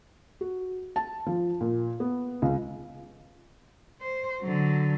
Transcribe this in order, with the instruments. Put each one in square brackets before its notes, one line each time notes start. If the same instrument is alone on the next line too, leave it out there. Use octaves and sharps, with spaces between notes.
[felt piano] F#4
A5
F3
A#2
B3
C#2
[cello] C5
D3 F#3